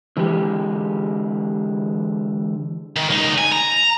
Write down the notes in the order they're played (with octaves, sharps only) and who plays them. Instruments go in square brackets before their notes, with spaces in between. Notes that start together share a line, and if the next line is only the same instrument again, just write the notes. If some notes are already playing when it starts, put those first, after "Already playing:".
[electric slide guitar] D3 E3 G#3 G4
[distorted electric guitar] D#3
C#2 D#4
G#5
A#5